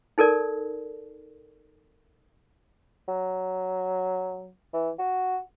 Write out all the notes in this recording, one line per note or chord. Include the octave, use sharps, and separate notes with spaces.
D#4 A4 A#4 D5
F#3
E3
F#4